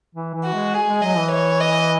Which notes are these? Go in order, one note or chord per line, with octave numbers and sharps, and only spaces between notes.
E3
E3
F#4
G#3
G#4
G#3
F#3 D#5
E3
C#5
D#5